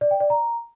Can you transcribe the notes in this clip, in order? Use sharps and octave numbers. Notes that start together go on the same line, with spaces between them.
D5
G5
D5
A#5